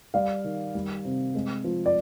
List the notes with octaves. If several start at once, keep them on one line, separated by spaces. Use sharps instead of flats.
G3 D5 F5
D#3
G3
C3
G#3
F3
D5